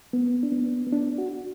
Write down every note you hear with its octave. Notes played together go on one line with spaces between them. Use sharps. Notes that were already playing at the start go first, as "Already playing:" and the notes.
B3
D4
B3
B3
D4
F#4